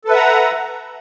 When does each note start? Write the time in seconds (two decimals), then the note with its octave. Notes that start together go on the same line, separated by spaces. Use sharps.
0.05 A4
0.08 B4
0.11 E5
0.14 F#5
0.17 A#5